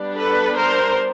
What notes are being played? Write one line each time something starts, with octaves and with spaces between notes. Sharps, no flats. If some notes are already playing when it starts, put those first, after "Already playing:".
Already playing: G3 B3 D4
A4 B4
A#4 C5